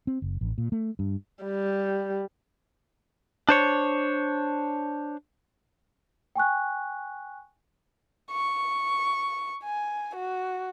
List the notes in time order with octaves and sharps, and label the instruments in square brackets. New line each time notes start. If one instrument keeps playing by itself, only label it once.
[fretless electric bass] C4
F#1
A1
A#2
A3
G2
[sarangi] G3
[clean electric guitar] D4 C5 C#5
[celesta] G5 G#5 C#6 F#6
[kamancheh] C#6
G#5
F#4